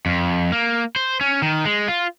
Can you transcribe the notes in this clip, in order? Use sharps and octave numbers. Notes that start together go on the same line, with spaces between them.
F2
A#3
C5
C#4
D#3
G#3
F4